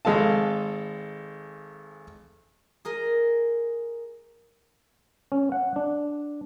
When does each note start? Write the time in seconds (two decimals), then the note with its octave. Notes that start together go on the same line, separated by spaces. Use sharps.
0.05 G#1 G#3 A4 F5 A5
2.85 G#4 A#4 D#5
5.32 C#4
5.52 F#5
5.76 D4